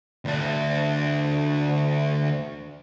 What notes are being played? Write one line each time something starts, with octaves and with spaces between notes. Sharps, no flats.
D2 D4